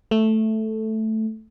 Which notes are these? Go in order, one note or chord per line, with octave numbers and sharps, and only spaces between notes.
A3